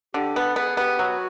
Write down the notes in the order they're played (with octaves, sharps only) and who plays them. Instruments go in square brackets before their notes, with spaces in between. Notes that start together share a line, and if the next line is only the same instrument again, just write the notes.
[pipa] D3 [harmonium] G4
[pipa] B3 [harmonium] A4
[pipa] B3 [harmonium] G#4
[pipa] B3 [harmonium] G4
[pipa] F#3 [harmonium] F#4